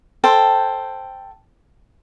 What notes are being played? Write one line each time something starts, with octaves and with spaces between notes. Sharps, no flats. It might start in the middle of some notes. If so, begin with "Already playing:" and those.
A4 C5 G5